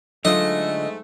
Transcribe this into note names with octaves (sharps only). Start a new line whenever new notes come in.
G#2 D3 F#3 G#3 A3 F4 D#5